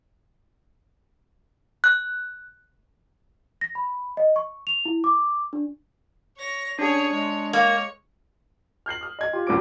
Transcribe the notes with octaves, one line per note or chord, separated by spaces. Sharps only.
F#6
A#6
B5
D#5
C#6
F7
E4
D6
D4
C#5 A#6
C#4 D4 G#4 C#5
G#3 C#5
A#3 C#5
F6 G6 C7 F#7
D#6 F6
D#5 G#6
F4 G4
A#1 F#2 C#3 C5 D6 D7